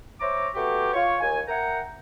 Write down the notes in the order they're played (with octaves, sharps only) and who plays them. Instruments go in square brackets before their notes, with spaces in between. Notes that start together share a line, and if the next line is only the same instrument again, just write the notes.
[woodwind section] C5 C#5 E5 A#5 D6
A3 B3 F#4 G4
F4 C#5
D#2 G#5
A#4 E5 F#5 G5 A#5